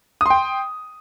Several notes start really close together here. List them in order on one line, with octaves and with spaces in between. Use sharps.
D#6 C6 G5